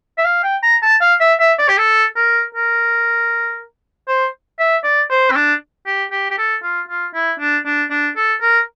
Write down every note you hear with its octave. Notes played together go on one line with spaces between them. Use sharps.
E5
F5
G5
A#5
A5
F5
E5
E5
D5
G4
A4
A#4
A#4
C5
E5
D5
C5
C4
D4
G4
G4
G4
A4
F4
F4
E4
D4
D4
D4
A4
A#4